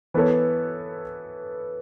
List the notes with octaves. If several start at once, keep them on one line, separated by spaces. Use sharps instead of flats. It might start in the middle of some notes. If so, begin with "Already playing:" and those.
E3 B3 A4 C#5